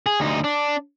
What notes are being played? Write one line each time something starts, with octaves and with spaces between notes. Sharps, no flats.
G#4
D2 D#4
D4